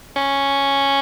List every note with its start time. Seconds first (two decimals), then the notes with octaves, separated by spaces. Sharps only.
0.16 C#4